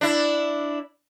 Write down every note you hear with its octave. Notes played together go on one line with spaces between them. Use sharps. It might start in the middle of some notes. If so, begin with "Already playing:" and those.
D4 E4